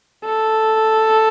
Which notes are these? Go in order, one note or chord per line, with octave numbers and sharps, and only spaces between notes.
A4